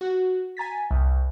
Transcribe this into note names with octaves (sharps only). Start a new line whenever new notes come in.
F#4
G#5 A#5 A6 B6
C2